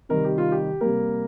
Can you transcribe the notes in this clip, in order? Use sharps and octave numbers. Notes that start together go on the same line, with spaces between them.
C3 D#3 G3 A#4
G4
F4
G4
C3 G3 A#3 A#4